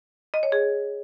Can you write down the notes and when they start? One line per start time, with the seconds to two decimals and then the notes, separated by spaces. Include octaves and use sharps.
0.34 D#5
0.43 C#5
0.52 G#4